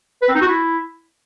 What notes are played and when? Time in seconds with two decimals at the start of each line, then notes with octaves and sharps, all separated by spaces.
0.22 B4
0.29 C4
0.35 D#4
0.42 F#4
0.48 E4